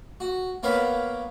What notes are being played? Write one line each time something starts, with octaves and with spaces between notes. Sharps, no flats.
F#4
A#3 B3 C#5 F5 B5